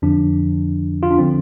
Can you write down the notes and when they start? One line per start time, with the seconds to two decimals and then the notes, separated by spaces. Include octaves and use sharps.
0.02 F2 D3 F3 D4
1.03 F4
1.11 D4
1.18 D3 F3 C4